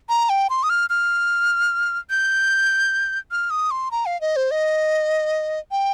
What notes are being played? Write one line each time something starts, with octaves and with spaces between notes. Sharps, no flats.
A#5
G5
C6
D#6
F6
F6
G6
F6
D#6
C6
A#5
F5
D#5
C5
D#5
G5